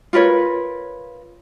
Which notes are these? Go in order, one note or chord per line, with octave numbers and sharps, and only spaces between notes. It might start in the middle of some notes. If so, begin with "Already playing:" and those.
F4 A#4 B4 C#5